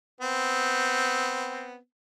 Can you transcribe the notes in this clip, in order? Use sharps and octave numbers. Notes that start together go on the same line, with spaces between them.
B3 C4